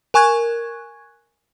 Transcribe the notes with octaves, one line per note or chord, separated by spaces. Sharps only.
A#4 G#5 C#6 F#6 G#6